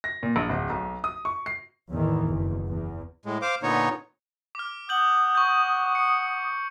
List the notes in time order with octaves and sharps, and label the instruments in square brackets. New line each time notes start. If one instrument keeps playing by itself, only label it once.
[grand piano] A#6
A#2
A#1
D1
B1
D#6
C#6
C7
[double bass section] E2 A2 D#3 E3
F#1 E2
E2
[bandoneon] A2 G#3
C5 F5 D6
A#2 D3 B3 D#4 C#5
[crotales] D6 F6
[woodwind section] F#5 D#6 [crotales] G6 F#7
[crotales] C#6 G6
C#7